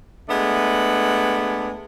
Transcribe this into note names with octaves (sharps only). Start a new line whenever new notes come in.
G#3 A3 B3 D4